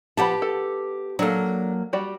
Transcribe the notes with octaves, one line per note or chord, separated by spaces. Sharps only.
F3 B3 G4 F#5 A5 B5
A4
F#3 A#3 D4 A4
G3 F#4 D5